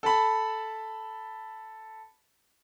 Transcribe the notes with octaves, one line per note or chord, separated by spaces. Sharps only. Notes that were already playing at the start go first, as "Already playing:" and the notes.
A4 A5 B5